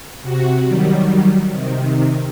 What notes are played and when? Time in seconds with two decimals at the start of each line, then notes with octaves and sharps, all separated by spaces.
0.23 C3 F#4
0.64 D#3 F#3 G3
1.51 C3 D#3